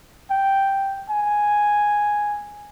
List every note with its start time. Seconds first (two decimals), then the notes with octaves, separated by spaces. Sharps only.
0.30 G5
1.10 G#5